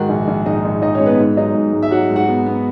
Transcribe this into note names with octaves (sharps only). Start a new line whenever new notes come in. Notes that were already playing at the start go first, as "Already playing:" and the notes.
Already playing: G#2 D#3 F#4 F#5
A#1
A#1
G#2 D#4 D#5
A#1
A#1 D#4 D#5
C#4 C#5
G#3
B3 B4
G#2
F#3 D#4 D#5
G#2
G#2
E5
F#3 F#4 F#5
G#2
F#4 F#5
B3
B3